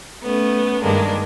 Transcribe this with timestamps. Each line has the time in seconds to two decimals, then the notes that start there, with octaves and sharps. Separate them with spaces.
0.23 A3 B3 C#4
0.83 G2 D#3 G#3 A#3 D4